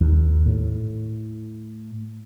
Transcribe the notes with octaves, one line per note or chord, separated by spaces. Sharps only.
D#2
A2